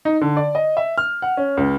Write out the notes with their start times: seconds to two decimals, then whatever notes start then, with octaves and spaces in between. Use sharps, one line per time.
0.05 D#4
0.21 D3
0.37 D5
0.55 D#5
0.77 E5
0.98 F6
1.22 F#5
1.37 C#4
1.57 C#2